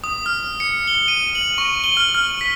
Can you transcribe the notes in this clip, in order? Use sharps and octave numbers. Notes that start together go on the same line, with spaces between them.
D#6
F6
C#7
G7
D#7
F#7
C#6
G7
F6
F6
B6